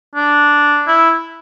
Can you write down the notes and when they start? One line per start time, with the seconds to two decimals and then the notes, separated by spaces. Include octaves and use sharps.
0.16 D4
0.88 E4